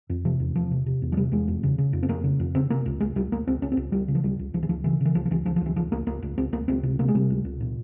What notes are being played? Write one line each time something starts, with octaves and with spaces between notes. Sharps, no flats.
F2
C3 F3
E2
E2 F3
C3
C3
E2
F3
C3 G3
E2 G#3
F2
C#3
C#3
F2
C4
F2 A#3
C#3
F2
C#3 C4
C3 A#3
C#2
C#2 G#3
C#2 G3
C#2 A#3
C#2 C4
C#2 C#4
C4
C#2
C#2 G3
C#3
F3
C#2 G3
C#2
C#2 F3
E3
C#2 F3
C#3 E3
C#3 E3
C#2 F3
F3
C#2 E3
C#2 F3
F3
C#2 E3
C#2 F3
C#2 A#3
C#2 A#3
C#2
C#2 C4
C#2 A#3
C#2 C4
C3
C3 A#3
G#3
C3 G3
C#2
C#2
A#2